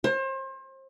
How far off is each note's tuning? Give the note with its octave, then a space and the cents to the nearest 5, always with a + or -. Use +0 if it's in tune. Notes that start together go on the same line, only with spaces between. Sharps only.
C5 +35